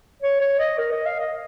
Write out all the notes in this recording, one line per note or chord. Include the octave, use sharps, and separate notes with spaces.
C#5
C#5
D#5
A#4
D#5
F5
D#5